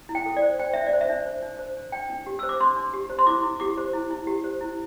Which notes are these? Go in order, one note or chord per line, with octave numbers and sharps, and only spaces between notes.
E4
G5
A4
D5
C5
C5 G5
D4 E5
D5
C5
E5
D4
C5
D4
C5
D4
D4 G5
D4
G4
C5 E6
D6
D4 C6
D4
G4
C5
C6
E4 D6
E4
G4 D6
C5
E4
E4
G4
C5
E4